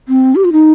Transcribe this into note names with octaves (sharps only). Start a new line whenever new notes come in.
C4
G4
F4
D#4